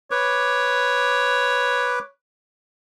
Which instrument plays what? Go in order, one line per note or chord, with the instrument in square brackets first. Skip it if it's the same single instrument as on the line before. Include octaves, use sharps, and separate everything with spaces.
[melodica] B4 D6 [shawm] C#5